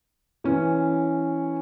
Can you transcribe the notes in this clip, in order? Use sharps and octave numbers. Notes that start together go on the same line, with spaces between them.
E3 C#4